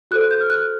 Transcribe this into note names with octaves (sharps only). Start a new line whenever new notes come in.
F#4 A4 C5 F#6
F#6
G6
F6
F#6